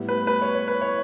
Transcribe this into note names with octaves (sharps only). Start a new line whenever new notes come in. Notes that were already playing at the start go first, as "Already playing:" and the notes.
Already playing: A2 G3 B3
B4
B4
C#5
C#5
B4
C#5